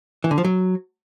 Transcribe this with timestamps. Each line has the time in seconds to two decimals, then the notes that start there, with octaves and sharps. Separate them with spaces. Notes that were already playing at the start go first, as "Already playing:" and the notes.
0.24 E3
0.31 D3
0.38 F3
0.44 F#3